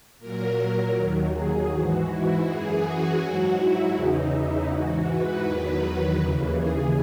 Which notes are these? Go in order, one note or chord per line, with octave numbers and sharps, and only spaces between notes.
A#2 F#3 A#4
D#2 D#3 F#3
G#4
G#2 E3 F#4
E4
F#2 E3 G#4
F#4
G#2 F#3
E4
E2 C#3 E3 D#4
E4
G#2 E3 F#4
B4
E2 D#3 F#3
D#2 C#3 E3
G#4